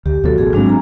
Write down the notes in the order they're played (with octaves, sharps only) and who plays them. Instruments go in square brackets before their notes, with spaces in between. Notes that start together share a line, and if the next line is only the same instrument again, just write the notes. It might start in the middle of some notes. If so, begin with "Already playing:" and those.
[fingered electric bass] D2 [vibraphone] G4
[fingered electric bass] D2 B2 F#3 [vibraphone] F#4 A4
[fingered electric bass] A1 B2 [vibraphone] G#4 A4
[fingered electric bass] G#2 F#3 C4 [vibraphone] G#3 D4
[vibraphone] G#5 A#5